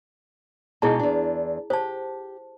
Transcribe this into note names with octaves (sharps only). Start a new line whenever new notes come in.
B2 G#3 D#4 E4 G#4 A5
E2 D4
G4 C5 A5